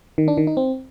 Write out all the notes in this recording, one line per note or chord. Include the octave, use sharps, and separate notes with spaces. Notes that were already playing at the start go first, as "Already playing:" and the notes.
D#3
D4
D#3
D#4
C4